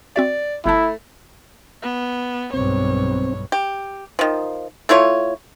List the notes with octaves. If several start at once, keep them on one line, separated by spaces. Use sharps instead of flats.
C4 F#4 D5 E5
G1 A3 E4 A5
B3
B1 G2 C4 C#5
G4
D#3 F3
A3 E4 F4 C#5